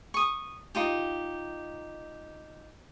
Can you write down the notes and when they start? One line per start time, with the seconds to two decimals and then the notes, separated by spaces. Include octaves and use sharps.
0.14 C#6 D#6
0.75 D#4 F4 G4